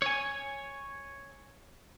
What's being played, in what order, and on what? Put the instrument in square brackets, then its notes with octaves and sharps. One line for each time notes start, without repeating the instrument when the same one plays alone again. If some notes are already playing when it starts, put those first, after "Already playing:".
[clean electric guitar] C#5 G#5